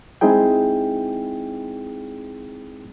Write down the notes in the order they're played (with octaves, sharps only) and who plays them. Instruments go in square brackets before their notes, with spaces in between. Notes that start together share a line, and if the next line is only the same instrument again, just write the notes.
[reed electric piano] G#3 C4 D#4 E4 G#4 G5